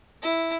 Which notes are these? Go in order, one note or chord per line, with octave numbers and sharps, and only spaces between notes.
E4